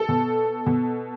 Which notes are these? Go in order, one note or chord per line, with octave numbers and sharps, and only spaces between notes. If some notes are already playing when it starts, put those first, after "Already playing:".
Already playing: A4
B2
B2